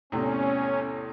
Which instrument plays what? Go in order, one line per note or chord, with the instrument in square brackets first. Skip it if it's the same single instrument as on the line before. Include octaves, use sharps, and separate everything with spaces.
[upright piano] E2 A2 C3 [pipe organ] C#4